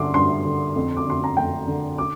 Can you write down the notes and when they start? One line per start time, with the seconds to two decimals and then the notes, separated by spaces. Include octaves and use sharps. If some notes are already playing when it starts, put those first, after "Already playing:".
Already playing: G2 D3 C6 D6
0.14 G2 C6
0.45 D3
0.76 F2
0.97 D6
1.06 D3 C6
1.24 A#5
1.37 F2 G5
1.67 D3
1.98 D6